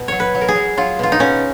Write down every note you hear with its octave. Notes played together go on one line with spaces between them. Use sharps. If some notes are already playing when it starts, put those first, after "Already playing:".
Already playing: B2
F#3 C#5
B4
F#3
A#4
G#4
F#3
F#3 F4
B2 F4
D#4
B2 C#4